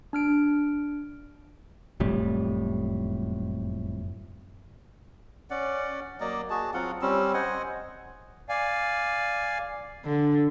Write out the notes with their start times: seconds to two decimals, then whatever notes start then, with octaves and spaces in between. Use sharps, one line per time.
0.13 D4 F6 D7
2.00 F#1 F2 A2 G3
5.50 C#4 D5 F#5
6.21 F#3 A#3 D5 D#5
6.50 F#4 G#4 A5
6.74 F#3 C4 F4 F#5
7.02 G3 C4 C#4 E6
7.34 C5 D#5 F#5 G#5
8.49 D5 F5 G#5
10.05 D3